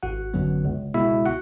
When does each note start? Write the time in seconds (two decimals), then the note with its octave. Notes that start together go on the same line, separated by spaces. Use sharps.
0.03 G#1 F#4 F#5
0.34 F#2 D3 F#3 B3
0.65 C#2
0.94 B2 G#3 E4 E5
1.26 F#4 F#5